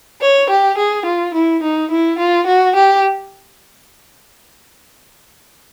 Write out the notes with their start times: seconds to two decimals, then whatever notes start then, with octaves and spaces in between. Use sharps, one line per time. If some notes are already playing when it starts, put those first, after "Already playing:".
0.21 C#5
0.50 G4
0.77 G#4
1.05 F4
1.34 E4
1.63 D#4
1.91 E4
2.18 F4
2.46 F#4
2.75 G4